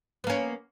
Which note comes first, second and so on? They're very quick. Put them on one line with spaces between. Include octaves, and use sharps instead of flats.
B3 A#3 C#4